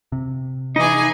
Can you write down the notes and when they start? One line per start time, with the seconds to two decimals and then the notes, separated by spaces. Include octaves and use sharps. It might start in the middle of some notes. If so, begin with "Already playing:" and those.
0.12 C3
0.76 E3 D#4 G#4 D#5 G#5 D6